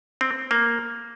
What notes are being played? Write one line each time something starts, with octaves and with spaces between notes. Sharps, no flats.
C4
A#3